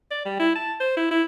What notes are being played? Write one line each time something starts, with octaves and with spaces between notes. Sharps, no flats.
D5
G3
E4
A5
C5
E4
E4